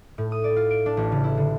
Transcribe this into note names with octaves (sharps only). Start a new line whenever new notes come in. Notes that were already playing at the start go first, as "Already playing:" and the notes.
A2
D#6
D5
F4
D7
D4
A1
C#3
E4
D3